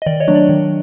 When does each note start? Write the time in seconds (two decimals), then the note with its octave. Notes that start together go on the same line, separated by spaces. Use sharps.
0.02 D#5
0.06 D#3 D5
0.20 C#5 D#5
0.28 F#3 A3 D4
0.35 D5
0.49 D#3